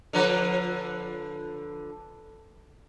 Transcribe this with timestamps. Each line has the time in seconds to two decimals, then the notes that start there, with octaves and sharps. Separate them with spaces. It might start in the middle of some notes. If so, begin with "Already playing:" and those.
0.13 D3 F3 B4